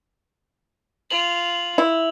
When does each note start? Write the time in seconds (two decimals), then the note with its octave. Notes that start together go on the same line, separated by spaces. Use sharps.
1.11 F4 F7 F#7
1.78 E4